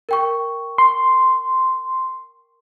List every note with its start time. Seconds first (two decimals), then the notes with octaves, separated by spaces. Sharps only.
0.09 A#4 G5 C#6
0.78 C6